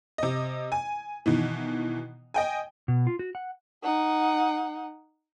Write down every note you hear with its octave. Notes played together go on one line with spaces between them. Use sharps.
C3 D#5
G#5
B2 D#3 E3
D#5 G5 G#5
B2
F4
F#4
F#5
D#4 F#5